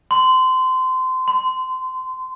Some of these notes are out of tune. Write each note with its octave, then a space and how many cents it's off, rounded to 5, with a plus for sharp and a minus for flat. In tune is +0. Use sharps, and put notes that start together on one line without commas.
C6 -25
C6 -40